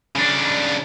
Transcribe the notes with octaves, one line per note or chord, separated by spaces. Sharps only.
C#3 D4